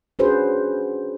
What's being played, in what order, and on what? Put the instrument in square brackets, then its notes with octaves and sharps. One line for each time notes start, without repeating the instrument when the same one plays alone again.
[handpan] C#4 D4 F#4 G#4 B4 C5